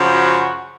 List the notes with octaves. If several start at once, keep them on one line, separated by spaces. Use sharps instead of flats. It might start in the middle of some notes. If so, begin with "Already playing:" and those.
Already playing: F#2 C#3 F3
F#4